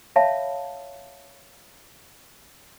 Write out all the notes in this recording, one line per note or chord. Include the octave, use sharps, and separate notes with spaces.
C#5 E5 F5 A5 B5